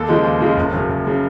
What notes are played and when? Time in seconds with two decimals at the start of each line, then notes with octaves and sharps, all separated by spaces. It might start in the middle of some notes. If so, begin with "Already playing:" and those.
Already playing: D#2 A4
0.09 C#3 F3 G#3
0.24 D#2
0.40 C#3 F3 G#3
0.57 F#1
0.72 F#2 C#3
0.89 F#1
1.07 C#3